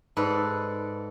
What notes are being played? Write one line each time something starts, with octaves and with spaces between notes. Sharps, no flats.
G#2 A4 B4 D5